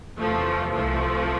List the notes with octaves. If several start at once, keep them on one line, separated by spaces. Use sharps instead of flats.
E2 C3 E3 F3 A3
C2 C3 E3 F3 A3